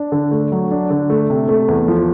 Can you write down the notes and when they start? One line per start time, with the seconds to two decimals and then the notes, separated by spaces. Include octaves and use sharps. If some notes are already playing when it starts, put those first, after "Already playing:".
Already playing: D4
0.12 D3
0.31 A3
0.52 F#3
0.71 D4
0.90 D3
1.10 A3
1.30 C3
1.49 A3
1.68 E2
1.88 F3